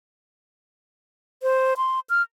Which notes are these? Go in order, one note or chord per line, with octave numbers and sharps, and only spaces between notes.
C5
C6
F6